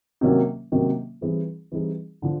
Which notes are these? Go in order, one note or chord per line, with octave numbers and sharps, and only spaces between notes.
C3 D#3 F#3 A#3 C#4
C3 D#3 F#3 A#3 C#4
E3 G3 C4 D#4 G#4
E3 G3 C4 D#4 G#4
D3 F3